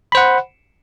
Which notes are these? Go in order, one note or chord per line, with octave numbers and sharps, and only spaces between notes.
C5 F#5 B5